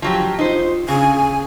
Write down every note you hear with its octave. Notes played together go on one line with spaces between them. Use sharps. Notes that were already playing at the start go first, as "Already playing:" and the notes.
F3 F#3 G4
D#4 F4 C5
C#3 G#4 G#5